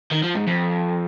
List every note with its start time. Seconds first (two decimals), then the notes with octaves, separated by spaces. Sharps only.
0.11 D#3
0.23 F3
0.35 G#2
0.48 F2